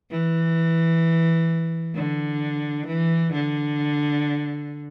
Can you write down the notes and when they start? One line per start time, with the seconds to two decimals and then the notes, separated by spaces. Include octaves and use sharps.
0.11 E3
1.95 D3
2.87 E3
3.33 D3